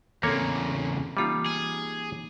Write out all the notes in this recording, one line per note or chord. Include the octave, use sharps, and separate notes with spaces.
E2 C#3 A#3 C4 A4 C#5
E3 G3 A#3 D#4 F4
G#4